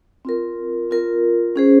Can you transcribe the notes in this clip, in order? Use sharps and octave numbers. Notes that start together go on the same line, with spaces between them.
C4 F4 A#4
C4 F4 A#4
C#4 G#4 C5